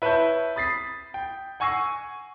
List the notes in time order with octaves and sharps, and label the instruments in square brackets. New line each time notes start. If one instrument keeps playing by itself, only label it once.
[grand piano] E4 B4 C#5 E5 A5 G6
B5 D#6 A6 B6 C7
G5
F#5 G#5 C#6 E6 A#6 C7